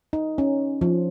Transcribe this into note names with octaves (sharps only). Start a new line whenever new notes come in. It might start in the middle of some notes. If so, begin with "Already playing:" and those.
D#4
C#4
F3